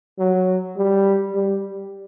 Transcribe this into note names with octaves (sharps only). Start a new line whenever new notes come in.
F#3
G3
G3